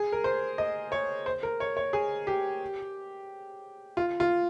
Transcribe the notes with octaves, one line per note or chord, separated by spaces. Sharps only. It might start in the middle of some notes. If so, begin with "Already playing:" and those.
Already playing: G#4
A#4
C5
D#5
C#5
C5
A#4
C#5
C#5
G#4
G4
F4
F4